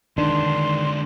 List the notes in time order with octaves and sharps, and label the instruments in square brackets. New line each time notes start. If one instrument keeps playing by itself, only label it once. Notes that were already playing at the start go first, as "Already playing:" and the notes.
[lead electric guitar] D3 G#3 [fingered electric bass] D#3 [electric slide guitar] D4 [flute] C6